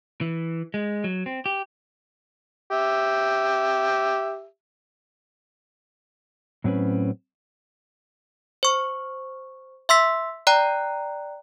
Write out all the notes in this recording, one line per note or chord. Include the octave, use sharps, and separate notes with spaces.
E3
G#3
F#3
C4
G4
G4 E5
A2 F#3 C4 C#4 B4
C5 C#6
E5 C6 E6 B6
D5 G5 A#5 F#6